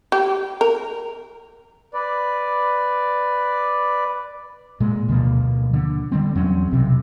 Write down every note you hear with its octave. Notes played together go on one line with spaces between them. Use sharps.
G4
A#4
B4 D5
A#2 G#3
D2 B2 F3 A#3
D3
D3 F#3 G3 C4
E2 F#3 C4 C#4
B1 C3